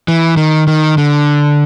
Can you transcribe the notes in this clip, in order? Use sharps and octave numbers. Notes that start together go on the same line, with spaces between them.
E3
D#3
D#3
D3